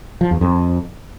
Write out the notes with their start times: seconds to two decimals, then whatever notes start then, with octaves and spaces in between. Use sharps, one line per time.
0.21 F3
0.31 E2
0.41 F2